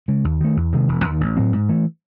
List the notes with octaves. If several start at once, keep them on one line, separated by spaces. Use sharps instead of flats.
C#3 G#3
D#2
D#3 A3
E2
C3 D#3 G#3
E1
D#2 D#3
A1
A2 F#3 C4
G#2
E3 A3